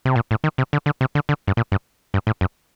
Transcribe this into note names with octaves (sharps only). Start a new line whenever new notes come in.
C3
A#2
A2
D#3
C3
D3
D3
C3
D3
D3
G2
A#2
G2
G2
A2
F#2